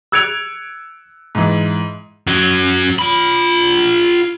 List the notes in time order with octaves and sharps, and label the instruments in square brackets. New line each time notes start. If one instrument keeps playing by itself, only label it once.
[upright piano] E6 F#6 G#6 C#7 D7 F7
G#2 E3
[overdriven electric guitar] F#2 F#3
F4 B5